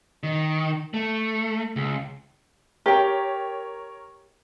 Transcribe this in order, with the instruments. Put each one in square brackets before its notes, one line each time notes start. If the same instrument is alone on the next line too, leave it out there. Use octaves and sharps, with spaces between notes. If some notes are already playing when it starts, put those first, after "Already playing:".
[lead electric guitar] D#3
A3
C#2
[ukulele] G4 G5 [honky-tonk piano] A#4 C#5